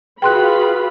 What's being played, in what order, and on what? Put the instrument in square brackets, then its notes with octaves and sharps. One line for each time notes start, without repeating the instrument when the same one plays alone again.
[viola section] F4 F#4 B5 [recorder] G#4 [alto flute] B4 [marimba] G5 C6 F#6